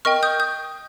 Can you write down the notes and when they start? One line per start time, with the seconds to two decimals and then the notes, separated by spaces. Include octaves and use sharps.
0.05 A#4 D#5 G5 C#6 F6
0.23 D#6 G6
0.40 D#6 G6